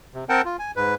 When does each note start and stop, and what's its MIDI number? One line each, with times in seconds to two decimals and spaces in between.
0.14 0.24 48
0.29 0.42 60
0.29 0.42 70
0.29 0.42 78
0.29 0.42 79
0.29 0.42 81
0.45 0.57 65
0.59 0.71 80
0.76 0.95 44
0.76 0.95 71